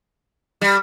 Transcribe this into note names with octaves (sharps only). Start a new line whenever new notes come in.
G3